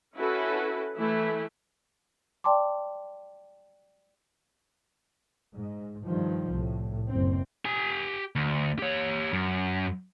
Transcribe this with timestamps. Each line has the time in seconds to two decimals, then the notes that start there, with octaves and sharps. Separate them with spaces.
0.15 C#4 E4 F#4 A4 B4
0.96 E3 A3 E4
2.44 D5 G5 A5 C6 D6
5.53 G#2
6.05 G2 D#3 F3
6.49 C2 A2
7.08 F#1 C4
7.65 G4 G#5
8.36 D2
8.79 G4 C#5
9.33 F#2